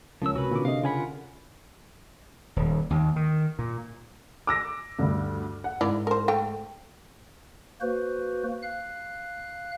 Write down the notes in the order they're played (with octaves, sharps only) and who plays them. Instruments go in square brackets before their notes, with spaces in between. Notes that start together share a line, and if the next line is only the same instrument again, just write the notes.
[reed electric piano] C#2 [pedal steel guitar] F3 E6 [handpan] C#4 A#4
[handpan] C3 [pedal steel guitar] F#4 B4 B5
[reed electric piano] A#2 D6 [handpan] D3
[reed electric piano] C3 D#5 [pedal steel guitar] F5
[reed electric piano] C#3 G#5 B5 [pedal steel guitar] F4 A#4 F#5
[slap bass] D#1
D#2
D#3
A#2
[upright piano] D6 E6 A#6
D2 G2
F#5
[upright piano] G#2 [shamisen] E4 A#4 D5
[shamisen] A#4 C5
A3 G5
[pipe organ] A#3 F#4 B4 C5
F5 F#6